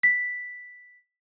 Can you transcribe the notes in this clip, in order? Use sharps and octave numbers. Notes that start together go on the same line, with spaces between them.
B6